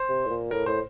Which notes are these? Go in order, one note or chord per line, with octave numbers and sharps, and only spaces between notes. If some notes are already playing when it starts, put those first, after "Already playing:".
Already playing: C5
C3
A2
A#2
A2 A#4
A2 C5